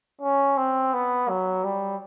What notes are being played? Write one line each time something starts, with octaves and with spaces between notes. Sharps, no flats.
C#4
C4
B3
F#3
G3